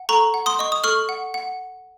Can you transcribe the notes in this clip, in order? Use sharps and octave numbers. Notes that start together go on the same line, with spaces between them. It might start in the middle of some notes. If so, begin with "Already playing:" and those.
Already playing: F#5
A4 A#5 C#6
F#5
C6 D#6
D#5 C#6
D#6
A4 C#6 F6
F#5
F#5